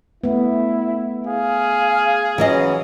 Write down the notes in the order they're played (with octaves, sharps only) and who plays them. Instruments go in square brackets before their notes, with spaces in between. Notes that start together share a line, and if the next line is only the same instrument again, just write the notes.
[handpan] A3 B3 [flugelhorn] E4
[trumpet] G#4 [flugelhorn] F5
[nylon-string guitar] E3 C#4 D#5 [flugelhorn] F#3